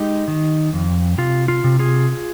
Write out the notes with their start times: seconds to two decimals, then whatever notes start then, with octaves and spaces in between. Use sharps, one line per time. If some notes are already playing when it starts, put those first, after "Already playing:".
Already playing: G#3 D#4 G4
0.28 D#3
0.73 F2
1.18 C3 F4
1.48 F4
1.64 C3
1.79 F4 G#4